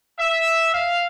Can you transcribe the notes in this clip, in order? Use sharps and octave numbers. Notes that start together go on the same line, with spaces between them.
E5
F5